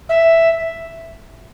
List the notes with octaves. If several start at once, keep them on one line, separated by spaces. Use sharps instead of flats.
E5